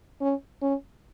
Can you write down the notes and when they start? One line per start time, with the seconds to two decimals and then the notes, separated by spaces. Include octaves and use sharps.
0.21 C#4
0.62 C#4